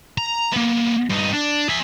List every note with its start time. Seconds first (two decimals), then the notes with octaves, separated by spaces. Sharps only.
0.18 A#5
0.52 A#3 B3
1.10 G2 D#4
1.33 D4
1.69 G#4 E5